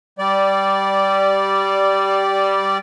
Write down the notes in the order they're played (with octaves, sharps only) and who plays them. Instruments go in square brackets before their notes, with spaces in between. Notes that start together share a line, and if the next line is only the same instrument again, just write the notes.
[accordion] G3 D5